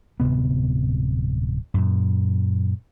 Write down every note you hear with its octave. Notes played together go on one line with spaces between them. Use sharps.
D1 G2 C3 B3
F#2 A#2